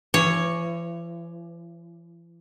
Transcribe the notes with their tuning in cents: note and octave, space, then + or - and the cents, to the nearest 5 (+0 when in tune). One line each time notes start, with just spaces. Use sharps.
E3 +45 C#5 +0